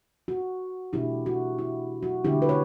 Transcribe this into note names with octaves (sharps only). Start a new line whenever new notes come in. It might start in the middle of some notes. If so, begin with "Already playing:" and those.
F#4
B2 A3 D4 E4 G4
F#4
E4
F#4
D3 A3 D4 E4 G4
B4
C#5